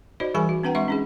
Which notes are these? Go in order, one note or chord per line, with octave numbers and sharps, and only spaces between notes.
D#4 F#4 C5 D5 D#5
E3 G3 G#4 A#4 G#5 B5
F#4
C4 D4 B4 F#5 G5 A#5
G#3 E5 F#5 C6 C#6
C#4 D#4 G#4